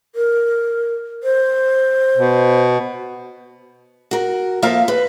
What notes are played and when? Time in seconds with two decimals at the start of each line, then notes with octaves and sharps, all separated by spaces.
0.15 A#4
1.23 C5
2.17 B2
4.11 F#4 A#4
4.62 F3 A#3 A4 A#4 E5 F5
4.88 B4